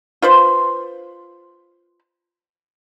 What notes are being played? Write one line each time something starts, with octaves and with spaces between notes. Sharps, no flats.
F4 B4 C5